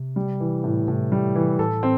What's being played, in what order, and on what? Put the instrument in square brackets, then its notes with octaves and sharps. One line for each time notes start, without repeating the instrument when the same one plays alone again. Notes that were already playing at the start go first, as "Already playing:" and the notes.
Already playing: [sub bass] C3
[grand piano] G3
E3
A2
[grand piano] A2 [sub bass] C3
[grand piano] G3
E3
[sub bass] A2 [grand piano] A4
[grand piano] C4